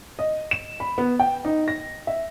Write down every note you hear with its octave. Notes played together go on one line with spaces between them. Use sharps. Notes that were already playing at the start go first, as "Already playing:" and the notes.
D#5
E7
B5
B3
G5
D#4
A#6
E5